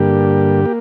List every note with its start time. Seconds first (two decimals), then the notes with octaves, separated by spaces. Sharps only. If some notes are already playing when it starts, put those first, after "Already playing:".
Already playing: G2 D3 A#3 G4
0.65 A#3